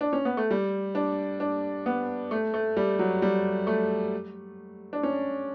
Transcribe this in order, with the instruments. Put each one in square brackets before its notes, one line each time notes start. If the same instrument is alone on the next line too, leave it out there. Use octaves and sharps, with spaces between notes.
[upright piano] D4
C#4
B3
A3
G3
D4
D4
B3
A3
A3
G3
F#3
G3
A3
D4
C#4